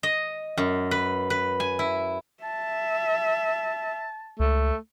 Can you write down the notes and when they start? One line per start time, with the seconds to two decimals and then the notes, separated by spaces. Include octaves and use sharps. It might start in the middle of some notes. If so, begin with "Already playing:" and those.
0.03 D#5
0.57 F#2
0.91 B4
1.30 B4
1.60 G#5
1.79 E4
2.43 E5 A5
4.39 C#2 A3